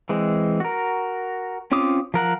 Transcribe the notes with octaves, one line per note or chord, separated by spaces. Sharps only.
E3 G#3 C4
F#4 A#4
C4 C#4 F4 D6 D#6
F3 A#4 F#5